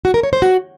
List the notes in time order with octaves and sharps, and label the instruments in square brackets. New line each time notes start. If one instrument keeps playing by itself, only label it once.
[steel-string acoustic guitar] F#4
A#4
C#5
C5
F#4